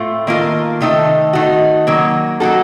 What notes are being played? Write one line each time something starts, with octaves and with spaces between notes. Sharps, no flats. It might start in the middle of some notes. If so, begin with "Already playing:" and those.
Already playing: A2 A3 C4 F4
D#3 A#3 F4 A4
C3 D#3 A3 D#4 A4
D#3 A3 D#4 F#4
D#3 F#3 A#3
F#3 A#3 D#4 F#4 A4